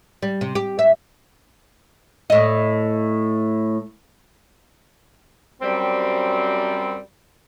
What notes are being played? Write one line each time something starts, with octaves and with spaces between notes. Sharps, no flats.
G3
C3
G4
E5
A2 D#5
F#2 G3 C4